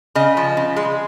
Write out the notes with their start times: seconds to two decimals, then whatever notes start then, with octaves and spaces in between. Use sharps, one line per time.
0.15 C#3 D#5
0.37 F3
0.57 C#3
0.76 G#3